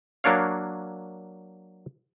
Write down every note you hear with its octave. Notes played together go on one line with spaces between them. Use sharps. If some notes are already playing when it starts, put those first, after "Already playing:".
F#3 A#3 D4 C#5 F5